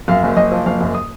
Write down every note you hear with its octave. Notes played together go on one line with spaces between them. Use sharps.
F#2 F5
F#1
F#1 D#5
F3
F#1 F5
F#2
D#6